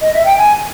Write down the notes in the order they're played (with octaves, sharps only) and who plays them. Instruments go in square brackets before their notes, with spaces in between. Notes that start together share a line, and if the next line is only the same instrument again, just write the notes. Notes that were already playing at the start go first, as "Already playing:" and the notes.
[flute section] D#5
E5
G5
G#5